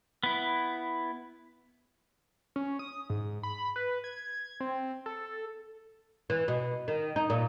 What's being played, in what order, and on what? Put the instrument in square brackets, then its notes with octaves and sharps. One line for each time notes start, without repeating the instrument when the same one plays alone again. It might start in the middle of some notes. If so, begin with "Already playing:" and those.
[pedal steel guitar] B3 E4
[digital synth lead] C#4
D#6
G#2
B5
B4
G#6
C4
A4
[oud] E3
B2
D#3
D#4
A#2